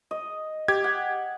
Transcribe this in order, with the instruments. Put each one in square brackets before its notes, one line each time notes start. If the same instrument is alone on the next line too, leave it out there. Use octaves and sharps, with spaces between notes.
[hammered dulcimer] D#5
[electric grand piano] G4 G#6
[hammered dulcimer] F#5